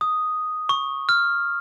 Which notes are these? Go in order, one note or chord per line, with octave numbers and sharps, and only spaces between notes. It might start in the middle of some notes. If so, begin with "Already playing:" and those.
D#6
C#6
F6